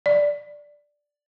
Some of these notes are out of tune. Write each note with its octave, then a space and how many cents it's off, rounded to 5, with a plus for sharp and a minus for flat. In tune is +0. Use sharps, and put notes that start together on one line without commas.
D5 +0